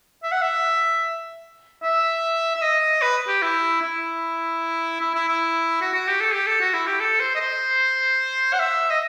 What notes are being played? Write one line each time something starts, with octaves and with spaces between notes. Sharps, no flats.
E5
F#5
E5
E5
E5
D#5
B4
G4
E4
E4
E4
E4
E4
F#4
F#4
G4
A4
G4
A4
F#4
E4
G4
A4
C5
D#5
C5
F#5
E5
D#5